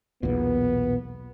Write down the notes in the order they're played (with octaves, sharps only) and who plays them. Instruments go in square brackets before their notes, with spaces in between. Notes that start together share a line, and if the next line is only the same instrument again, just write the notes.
[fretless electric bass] B1 E2 A#2 [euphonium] B3